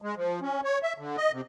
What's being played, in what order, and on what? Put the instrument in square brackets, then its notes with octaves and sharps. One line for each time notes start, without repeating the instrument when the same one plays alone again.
[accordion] G#3
F3
C#4
C#5
E5
D3
D#5
C3